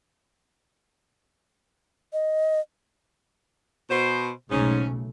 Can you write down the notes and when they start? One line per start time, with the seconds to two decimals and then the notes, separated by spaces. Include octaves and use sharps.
2.13 D#5
3.90 B2 C5
4.51 B1 G#2 C#3 A3 C#4